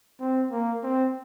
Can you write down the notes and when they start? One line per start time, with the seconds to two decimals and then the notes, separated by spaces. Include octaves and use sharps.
0.20 C4
0.51 A#3
0.83 C4